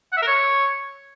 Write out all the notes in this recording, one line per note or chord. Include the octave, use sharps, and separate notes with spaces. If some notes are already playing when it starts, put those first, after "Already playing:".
F#5
E5
A#4
C#5